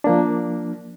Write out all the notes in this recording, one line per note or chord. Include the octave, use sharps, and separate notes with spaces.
F3 A#3 D4